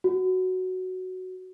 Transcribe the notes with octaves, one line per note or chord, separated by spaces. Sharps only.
F#4